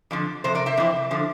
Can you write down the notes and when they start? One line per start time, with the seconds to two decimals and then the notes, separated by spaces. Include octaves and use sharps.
0.11 F2 D3 F3
0.44 F2 C3 C5
0.55 A#4 D5
0.66 C5 E5
0.77 F2 C3 E3
1.11 D3 F3